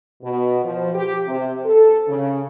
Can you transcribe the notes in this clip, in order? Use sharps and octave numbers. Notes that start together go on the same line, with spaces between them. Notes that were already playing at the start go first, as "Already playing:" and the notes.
B2
F3
G4
C3
A4
C#3